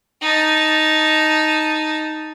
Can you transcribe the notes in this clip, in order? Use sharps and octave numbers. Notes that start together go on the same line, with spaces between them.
D#4 A5